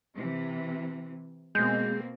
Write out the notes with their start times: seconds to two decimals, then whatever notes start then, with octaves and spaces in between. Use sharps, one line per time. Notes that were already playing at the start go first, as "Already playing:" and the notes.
0.14 C3 E3
1.55 B2 G#3 A#3 C4 G6